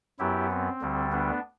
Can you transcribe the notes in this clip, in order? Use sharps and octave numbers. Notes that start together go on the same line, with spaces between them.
F#2 F#3 B3 E4 G4
C4
D2 D3 G3
B3 D4